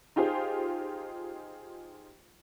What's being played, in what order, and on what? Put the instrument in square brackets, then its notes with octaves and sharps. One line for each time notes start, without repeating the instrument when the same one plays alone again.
[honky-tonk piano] D#4 F4 G4 G#4 C5